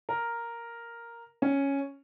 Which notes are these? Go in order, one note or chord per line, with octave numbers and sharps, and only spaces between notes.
A#4
C#4